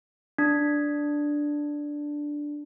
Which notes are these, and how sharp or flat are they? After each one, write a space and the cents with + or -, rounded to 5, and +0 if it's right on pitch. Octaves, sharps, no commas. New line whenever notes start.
D4 +0